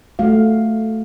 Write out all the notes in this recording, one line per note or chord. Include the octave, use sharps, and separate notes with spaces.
A3 F#4 F5